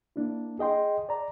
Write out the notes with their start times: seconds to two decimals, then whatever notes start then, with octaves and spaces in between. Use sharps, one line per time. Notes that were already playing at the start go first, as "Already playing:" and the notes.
0.16 A#3 D4 E4
0.59 G#4 D#5 G5 C6
1.09 D5 A#5